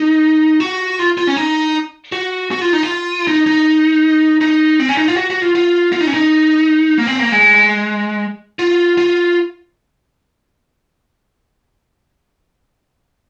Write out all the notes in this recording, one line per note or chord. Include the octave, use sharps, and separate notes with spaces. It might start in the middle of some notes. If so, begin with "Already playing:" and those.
Already playing: D#4
F#4
F4
F4
C#4
D#4
F#4
F#4
F4
D#4
F4
D#4
D#4
D#4
C4
C#4
D#4
F4
F#4
F#4
F4
F4
F4
D#4
C#4
D#4
A#3
C4
A#3
G#3
F4
F4